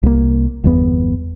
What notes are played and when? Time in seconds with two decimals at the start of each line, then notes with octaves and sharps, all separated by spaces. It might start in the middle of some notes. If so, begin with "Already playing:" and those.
0.03 C2 A#3
0.64 G1 E2 B3